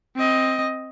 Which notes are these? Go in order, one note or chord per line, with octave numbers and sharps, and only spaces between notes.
C4 D#5